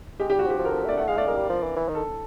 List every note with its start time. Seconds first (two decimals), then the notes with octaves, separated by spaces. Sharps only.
0.20 G#3 G4
0.30 G4
0.33 G3
0.39 F#4
0.46 F3
0.50 G4
0.59 F3
0.65 A#4
0.68 A4
0.72 F3
0.79 A4
0.85 A3 D5
0.97 A3 F#5
1.08 G#3 F5
1.17 A3 D5
1.27 G#3 A#4
1.36 G3
1.49 F3
1.63 E3
1.76 E3
1.88 D#3
1.95 A4